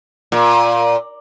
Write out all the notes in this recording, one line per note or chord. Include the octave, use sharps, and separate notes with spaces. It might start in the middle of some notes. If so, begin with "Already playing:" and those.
A#2